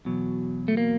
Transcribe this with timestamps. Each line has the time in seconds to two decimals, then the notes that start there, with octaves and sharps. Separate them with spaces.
0.05 E2 B2 F#3
0.68 A3
0.77 A#3